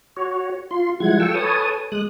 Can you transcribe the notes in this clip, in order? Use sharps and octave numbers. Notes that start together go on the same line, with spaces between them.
F#4 C#5
F4 C6
F3 G3 G#3 E4 F#5 G#6
F4 A4 G5 C#6 E6
A4 B4 C#5 G#5 A5 D#6
G#3 D#6 F#6